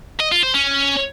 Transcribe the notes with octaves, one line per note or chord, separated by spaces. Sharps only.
D#5
F4
C5
C#4